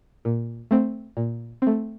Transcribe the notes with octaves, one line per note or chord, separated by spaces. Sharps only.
A#2
A3 C4
A#2
A3 C4